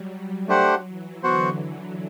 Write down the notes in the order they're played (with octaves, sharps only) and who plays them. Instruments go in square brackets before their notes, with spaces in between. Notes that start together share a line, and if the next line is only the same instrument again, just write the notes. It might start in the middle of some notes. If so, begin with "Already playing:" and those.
Already playing: [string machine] F#3 G3
[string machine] F#3 [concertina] A3 D4 G4 C5 F#5
[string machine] E3
[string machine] D3 [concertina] B3 F#4 C5 F#5